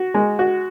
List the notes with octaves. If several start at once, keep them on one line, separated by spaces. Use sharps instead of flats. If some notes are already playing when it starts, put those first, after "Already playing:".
Already playing: F#4
G#3
F#4